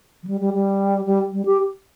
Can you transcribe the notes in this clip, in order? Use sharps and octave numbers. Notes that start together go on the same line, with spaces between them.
F3
G3
G3
G3
G3
G3
G4